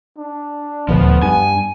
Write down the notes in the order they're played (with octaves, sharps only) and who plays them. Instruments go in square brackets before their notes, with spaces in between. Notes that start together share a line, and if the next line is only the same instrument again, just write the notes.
[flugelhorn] D4
[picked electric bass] D#1 D2 [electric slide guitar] F3 [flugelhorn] B3
[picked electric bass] G2 [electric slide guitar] G#5